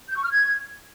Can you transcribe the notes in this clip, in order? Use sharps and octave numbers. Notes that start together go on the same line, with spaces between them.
G6
C#6
F6
G#6